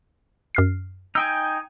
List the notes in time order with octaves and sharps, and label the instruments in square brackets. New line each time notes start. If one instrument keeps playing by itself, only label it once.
[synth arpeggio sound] F#2 F6 C7
[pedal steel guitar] D#4 G5 G#5 [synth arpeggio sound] E6